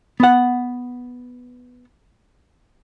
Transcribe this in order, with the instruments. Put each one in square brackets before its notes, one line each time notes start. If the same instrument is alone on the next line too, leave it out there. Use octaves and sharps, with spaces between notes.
[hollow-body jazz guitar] B3 F#5